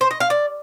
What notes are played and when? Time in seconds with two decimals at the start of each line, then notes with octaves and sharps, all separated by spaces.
0.01 C5
0.11 D#5
0.20 F5
0.30 D5